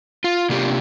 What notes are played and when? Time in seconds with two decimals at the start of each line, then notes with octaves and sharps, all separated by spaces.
0.24 F4
0.49 C3 A#3 D4 F4 G4